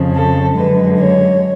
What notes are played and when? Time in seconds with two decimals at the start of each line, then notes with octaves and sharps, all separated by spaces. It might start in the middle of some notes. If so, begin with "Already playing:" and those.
Already playing: F2 C#3 F3
0.14 A4
0.56 F#2 D3 G#3 B4
0.97 C#5